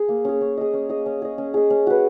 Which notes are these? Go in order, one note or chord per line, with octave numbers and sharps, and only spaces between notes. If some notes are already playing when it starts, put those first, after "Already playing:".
Already playing: G#4
A#3
C#4 G#4
C#4
G#4 D#5
C#4
G#4 D#5
C#4
G#4 D#5
C#4
G#4 D#5
C#4
F#4 B4